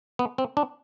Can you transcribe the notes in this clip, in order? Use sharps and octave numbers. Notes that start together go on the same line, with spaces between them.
B3
C4
D4